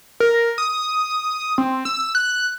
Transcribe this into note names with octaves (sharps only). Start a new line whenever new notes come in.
A#4
D#6
C4
E6
F#6